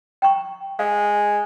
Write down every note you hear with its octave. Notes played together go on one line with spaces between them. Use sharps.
G5 A#5 C#6
G#3 F5